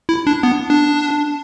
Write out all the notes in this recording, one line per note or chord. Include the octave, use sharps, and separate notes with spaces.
E4
D4
B3
D4